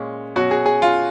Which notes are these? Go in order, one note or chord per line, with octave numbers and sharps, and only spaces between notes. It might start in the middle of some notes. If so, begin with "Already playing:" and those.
Already playing: A#2 G#3 C#4
B2 F#3 C#4 F#4
G#4
G#4
F4